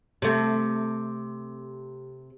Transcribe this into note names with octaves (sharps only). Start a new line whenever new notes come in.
C3 A3